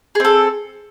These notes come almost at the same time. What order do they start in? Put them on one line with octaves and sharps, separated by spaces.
G#4 C4 A4